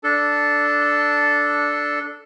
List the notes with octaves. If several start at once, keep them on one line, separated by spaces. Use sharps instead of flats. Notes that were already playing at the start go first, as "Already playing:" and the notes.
D4 A4